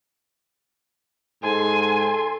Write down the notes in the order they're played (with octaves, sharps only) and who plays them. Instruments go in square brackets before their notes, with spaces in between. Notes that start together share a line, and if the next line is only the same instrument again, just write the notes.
[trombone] G#2 [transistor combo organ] A4 C6 [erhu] G#5